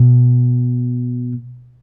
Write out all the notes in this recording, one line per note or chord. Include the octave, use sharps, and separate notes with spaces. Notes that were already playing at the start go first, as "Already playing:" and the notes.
Already playing: B2